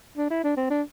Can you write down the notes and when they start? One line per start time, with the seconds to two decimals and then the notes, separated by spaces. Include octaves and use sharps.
0.17 D4
0.30 E4
0.44 D4
0.57 C4
0.70 D4